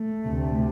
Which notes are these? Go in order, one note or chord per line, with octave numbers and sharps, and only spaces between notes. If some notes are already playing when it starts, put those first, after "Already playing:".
Already playing: A3
D2 C3